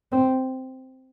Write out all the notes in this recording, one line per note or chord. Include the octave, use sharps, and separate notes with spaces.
C4